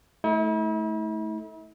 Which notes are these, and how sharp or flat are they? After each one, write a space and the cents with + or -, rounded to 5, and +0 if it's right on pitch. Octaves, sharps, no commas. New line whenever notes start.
A3 -15 E4 -40